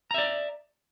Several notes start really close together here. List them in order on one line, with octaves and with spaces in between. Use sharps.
A#5 E5 D5